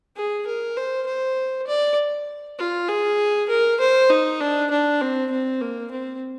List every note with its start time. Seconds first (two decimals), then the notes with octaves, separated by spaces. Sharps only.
0.16 G#4
0.47 A#4
0.77 C5
1.06 C5
1.68 D5
2.59 F4
2.89 G#4
3.49 A#4
3.80 C5
4.10 D#4
4.40 D4
4.71 D4
5.01 C4
5.31 C4
5.61 A#3
5.91 C4